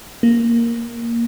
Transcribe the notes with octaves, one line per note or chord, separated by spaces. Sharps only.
A#3